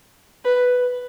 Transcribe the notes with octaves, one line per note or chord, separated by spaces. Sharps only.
B4